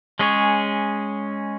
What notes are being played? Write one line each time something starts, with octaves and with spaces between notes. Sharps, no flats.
G#3 C#4 G#4 C#5